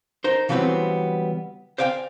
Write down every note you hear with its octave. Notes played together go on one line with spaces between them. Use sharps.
D#4 A#4 C5
C#3 E3 F#3 G3 B3 C4
C5 D5 F5 G5 G#5